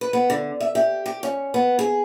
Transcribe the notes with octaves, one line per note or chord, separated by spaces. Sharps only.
B4
B3
D3
E5
G4
G4
C#4
B3
G#4